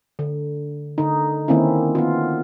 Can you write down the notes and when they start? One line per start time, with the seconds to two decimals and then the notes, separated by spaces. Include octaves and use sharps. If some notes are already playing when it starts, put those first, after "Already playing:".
0.19 D3
0.98 D3 D#4
1.48 D#3 A#3 C4 C#4 E4
1.95 B3 F4